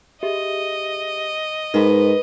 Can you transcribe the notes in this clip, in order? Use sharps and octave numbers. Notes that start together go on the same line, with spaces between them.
G4 G#4 D#5 E5
G#2 D#4 A#4 B4